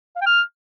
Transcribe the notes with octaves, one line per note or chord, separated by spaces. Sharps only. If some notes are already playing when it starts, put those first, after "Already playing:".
F5
G5
F6